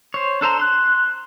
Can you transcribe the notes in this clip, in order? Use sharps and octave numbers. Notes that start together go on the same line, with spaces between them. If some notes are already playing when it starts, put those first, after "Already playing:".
C5 C#5
D4 A4 C5 A#5
C6 F#6